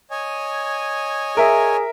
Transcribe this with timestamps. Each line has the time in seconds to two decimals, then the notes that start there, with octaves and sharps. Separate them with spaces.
0.11 C#5 D#5 G#5
1.37 G#4 A#4 E5